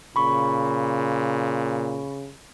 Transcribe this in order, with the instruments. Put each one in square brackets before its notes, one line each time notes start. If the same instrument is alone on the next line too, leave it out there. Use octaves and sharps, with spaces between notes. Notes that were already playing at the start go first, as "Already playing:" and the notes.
[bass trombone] A#2 [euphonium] C#3 [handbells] B5 C#6